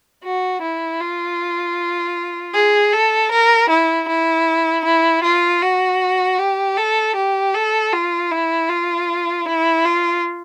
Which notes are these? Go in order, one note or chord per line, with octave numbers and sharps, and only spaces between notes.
F#4
E4
F4
G#4
A4
A#4
E4
E4
E4
F4
F#4
G4
A4
G4
A4
F4
E4
F4
E4
F4